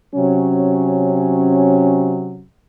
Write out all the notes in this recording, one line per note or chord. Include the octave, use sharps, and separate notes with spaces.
C3 F#3 C#4